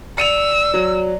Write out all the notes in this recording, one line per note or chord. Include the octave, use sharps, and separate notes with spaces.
D5 E6 C#7 D#7 F7
F#3